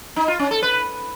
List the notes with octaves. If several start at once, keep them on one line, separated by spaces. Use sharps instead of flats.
D#4
F4
C#4
A4
B4